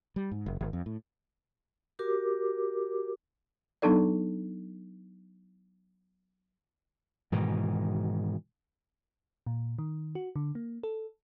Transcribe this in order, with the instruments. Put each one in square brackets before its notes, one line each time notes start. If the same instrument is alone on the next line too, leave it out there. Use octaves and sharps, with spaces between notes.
[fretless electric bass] G3
G#2
F#1
G#1
F2
A2
[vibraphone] F#4 G4 A#4 D6
[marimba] F#3 B3 D4 D#4 A4 D5
[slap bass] G#2 B2 D#3 E3
[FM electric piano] A#2
D#3
F#4
D3
A#3
A4